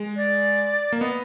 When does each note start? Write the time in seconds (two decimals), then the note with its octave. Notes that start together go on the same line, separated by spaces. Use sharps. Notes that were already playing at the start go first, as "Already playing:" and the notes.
Already playing: G#3
0.16 D5
0.92 A#3
1.00 B3 D#5